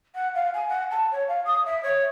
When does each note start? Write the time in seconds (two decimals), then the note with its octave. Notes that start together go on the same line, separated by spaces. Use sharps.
0.15 F#5
0.35 F5
0.54 G#5
0.68 F#5
0.91 A5
1.12 C#5
1.28 F5
1.45 D#6
1.66 E5
1.83 C#5